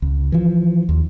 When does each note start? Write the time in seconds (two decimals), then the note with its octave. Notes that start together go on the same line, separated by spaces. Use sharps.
0.02 C#2
0.32 E3 F3
0.89 D#2